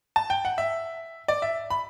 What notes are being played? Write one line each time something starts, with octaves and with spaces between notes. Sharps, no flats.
A5
G5
F#5
E5
D5
E5
B5